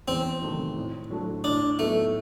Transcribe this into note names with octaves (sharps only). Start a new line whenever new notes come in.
E2 C4
C3 D#3 F#3 A3
A2
F#3 A3 D4
A2 D4
F#3 A3 B3 D#4